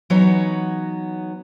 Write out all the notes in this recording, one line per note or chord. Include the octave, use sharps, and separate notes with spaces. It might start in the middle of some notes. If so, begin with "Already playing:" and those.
E3 F#3 B3 D#4 C#5